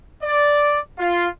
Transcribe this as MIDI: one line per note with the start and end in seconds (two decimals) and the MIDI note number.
0.23 0.79 74
0.99 1.27 65